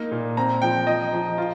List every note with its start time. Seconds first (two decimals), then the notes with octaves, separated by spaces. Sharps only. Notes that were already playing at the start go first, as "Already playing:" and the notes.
Already playing: A#3 D#4
0.12 A#2
0.37 C4 A#5
0.62 F3 G5
0.87 F3 D#5
1.13 F3
1.38 F4